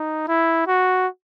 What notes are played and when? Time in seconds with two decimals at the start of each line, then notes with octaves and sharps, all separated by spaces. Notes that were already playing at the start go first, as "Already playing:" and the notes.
Already playing: D#4
0.28 E4
0.67 F#4